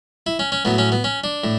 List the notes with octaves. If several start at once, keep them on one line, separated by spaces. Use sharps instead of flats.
E4
C#4
C#4
A2 F#3 B3
C#4
B3
C#4
D4
A2